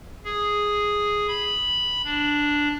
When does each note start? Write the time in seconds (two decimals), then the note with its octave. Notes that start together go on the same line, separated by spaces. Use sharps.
0.25 G#4
1.28 B5
2.04 D4